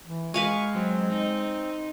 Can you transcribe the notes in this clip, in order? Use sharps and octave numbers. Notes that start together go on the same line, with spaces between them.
E3
G#3 B4 F5 G#5 C#6
F#3 C4
D#4